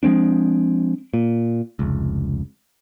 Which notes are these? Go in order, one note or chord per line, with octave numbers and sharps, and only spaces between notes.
F3 G#3 C4 D4
A#2
F1 C#2